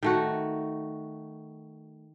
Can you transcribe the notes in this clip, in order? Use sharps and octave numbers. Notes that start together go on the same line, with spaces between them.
D#3 A3 F#4